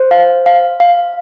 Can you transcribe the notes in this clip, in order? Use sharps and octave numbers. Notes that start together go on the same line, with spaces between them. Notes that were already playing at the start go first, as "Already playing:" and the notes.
Already playing: C5
F5
F5
F5